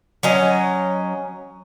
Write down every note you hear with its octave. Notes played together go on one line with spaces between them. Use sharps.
F#3 C#4 D#5